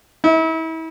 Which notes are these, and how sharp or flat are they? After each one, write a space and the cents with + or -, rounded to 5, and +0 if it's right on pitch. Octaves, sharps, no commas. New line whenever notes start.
E4 -35